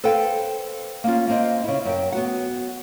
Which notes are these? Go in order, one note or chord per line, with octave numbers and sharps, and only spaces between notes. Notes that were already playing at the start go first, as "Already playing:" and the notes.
A4 B4 C5 F5 G5
A#3 C#4 F4
A#3 C4 D#5
C#3 E4
F#2 G5
B3 F#4 F#5